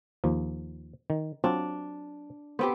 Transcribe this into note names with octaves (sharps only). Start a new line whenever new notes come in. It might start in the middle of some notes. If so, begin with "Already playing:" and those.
D#2 F3
D#3
F#3 C4 D4 F4
B3 C4 G4 C5